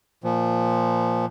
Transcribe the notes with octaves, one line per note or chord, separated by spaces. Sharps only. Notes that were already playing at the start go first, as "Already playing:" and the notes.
A#2 F3